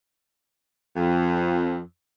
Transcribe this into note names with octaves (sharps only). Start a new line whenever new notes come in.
F2